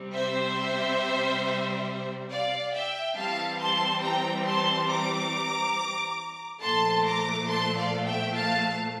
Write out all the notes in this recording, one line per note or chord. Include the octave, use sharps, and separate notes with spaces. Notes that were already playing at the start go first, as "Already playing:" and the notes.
Already playing: C3 G3 C4
C5 E5
D5 F5
E5 G5
E3 G3 C4 F5 A5
A5 C6
G5 A#5
A5 C6
A#5 D6
A#2 F3 A3 A5 C6
A#5 D6
A5 C6
D5 F5
E5 G5
F5 A5